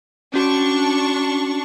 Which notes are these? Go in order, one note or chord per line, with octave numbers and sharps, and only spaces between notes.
C#4 D4 F#4 C#6